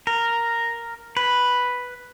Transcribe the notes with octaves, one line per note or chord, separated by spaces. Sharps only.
A#4
B4